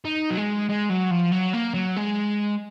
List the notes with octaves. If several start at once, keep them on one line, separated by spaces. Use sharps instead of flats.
D#4
F#3
G#3
G#3
F#3
F3
F#3
A#3
F#3
G#3